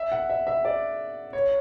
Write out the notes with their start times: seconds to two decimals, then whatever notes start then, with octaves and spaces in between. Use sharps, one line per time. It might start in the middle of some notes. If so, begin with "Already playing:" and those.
Already playing: E5
0.12 F#5
0.30 E5
0.47 E5
0.65 D5
1.33 C#5